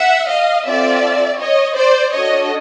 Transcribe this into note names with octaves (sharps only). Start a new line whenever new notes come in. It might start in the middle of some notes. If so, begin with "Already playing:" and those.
Already playing: E5 F#5
D#5 F5
C4 F4 A4 D5 E5
C#5 D#5
C5 D5
D4 F#4 A4 C#5 D#5